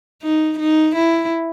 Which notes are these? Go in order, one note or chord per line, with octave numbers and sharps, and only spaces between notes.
D#4
D#4
E4